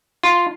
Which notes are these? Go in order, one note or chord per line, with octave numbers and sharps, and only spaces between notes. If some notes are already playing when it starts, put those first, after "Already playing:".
F4